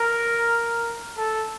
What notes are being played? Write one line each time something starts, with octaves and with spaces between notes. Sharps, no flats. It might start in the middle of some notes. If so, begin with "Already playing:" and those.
Already playing: A#4
A4